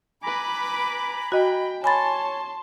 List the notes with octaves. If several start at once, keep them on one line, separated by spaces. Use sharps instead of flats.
B4 G#5 A#5 B5 D6
F#4 D#5 G5
C#5 G#5 A5 B5 C6 A6